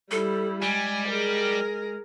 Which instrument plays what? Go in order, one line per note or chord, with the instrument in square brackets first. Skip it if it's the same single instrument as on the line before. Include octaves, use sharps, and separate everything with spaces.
[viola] G3 E4 [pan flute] A4
[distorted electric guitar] G3 [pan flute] G#3 [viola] G#5
[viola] G#4 A#4